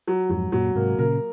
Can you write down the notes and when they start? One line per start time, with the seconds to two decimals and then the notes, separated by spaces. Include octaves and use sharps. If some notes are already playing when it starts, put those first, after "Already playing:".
0.07 F#3
0.30 F2 G#2 F#3
0.52 F#2 A#2 F#3
0.75 G#2 C3 A#3
0.98 A#2 C#3 A#4